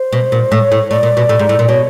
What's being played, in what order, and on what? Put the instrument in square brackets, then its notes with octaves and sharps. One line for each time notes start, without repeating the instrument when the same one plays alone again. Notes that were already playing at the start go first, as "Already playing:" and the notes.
Already playing: [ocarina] C5
[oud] B2
A#2
[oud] A2 [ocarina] C#5
[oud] A2
[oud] A2 [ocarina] D5
[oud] A#2
B2
A2
G#2
A2
A#2
[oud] B2 [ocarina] C#5